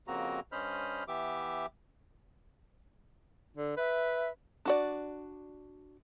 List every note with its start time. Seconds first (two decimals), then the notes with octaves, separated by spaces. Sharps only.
0.08 F2 C#3 A#3 C4 F#4 A#5
0.52 G2 C#4 C5 D#5 B5 F6
1.08 E3 B3 G4 E5 D6
3.57 D3
3.77 B4 E5
4.65 D4 F#4 D5